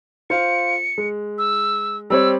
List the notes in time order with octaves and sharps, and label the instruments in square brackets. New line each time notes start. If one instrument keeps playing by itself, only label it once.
[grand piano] F4 C5 F5 [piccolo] C#7
[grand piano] G#3
[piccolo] E6
[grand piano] G3 C4 C#5 [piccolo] E6